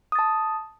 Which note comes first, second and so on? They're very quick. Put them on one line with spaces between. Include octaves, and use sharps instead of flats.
D#6 A6 A5